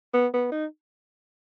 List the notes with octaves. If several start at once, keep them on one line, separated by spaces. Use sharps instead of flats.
B3
B3
D#4